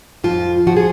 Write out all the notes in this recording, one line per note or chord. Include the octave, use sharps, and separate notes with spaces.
F2 F3 F4
F3 F#4
G#4